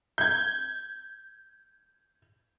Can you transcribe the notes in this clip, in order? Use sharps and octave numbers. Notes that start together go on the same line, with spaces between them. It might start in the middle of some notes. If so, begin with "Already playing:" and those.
G6 G#6